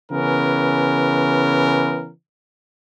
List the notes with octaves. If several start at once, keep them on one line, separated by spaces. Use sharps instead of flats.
C#3 E3 B3 C#4 A#4